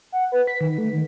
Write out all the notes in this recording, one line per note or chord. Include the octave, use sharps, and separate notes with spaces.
F#5
B4
B6
D#3
A3
D#3